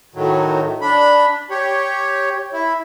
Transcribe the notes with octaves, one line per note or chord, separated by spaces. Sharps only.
A2 D#3 F#3
D4 B5
G4 C#5
E4